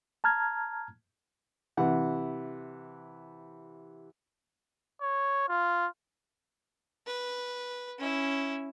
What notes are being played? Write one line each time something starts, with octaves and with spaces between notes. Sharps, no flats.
A5 A#5 F6 G#6
C3 E3 F#5
C#5
F4
B4
C#4 E4